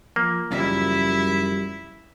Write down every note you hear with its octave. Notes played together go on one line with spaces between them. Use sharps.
F3 A#3
F#2 C#3 F3 G3 E4 E5